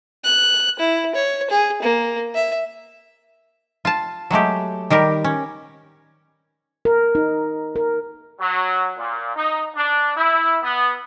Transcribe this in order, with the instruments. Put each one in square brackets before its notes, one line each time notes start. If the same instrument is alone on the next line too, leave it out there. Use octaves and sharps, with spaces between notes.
[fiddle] F#6
E4
C#5
G#4
A#3
E5
[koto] F4 A5
F#3 G#3 A3 G4
D#3 G3 G4 A#4
C#4
[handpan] A#4
D#4
A#4
[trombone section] F#3
A#2
D#4
D4
E4
B3